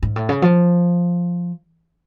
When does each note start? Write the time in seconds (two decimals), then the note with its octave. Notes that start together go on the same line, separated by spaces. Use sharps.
0.03 G#2
0.16 A2
0.29 C#3
0.42 F3